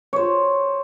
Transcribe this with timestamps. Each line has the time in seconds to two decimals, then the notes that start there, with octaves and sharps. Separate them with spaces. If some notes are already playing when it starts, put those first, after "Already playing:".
0.13 C5 C#5